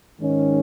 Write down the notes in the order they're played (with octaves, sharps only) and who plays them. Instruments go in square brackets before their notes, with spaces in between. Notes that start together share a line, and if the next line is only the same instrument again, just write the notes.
[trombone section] G#2 D#3 G#3 C#4